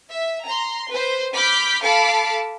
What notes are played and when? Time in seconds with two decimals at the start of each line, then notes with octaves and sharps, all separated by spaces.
0.10 E5
0.46 A#5 C6
0.91 B4 C5
1.33 B5 D6 F6 G6 B6
1.83 A4 F5 A5 B5 D6